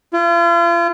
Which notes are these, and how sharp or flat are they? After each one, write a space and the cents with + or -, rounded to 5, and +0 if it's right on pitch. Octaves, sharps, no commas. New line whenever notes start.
F4 -40